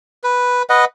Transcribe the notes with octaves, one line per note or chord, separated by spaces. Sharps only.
B4
B4 D#5 F#5